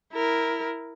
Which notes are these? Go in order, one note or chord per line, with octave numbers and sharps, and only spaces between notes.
E4 A#4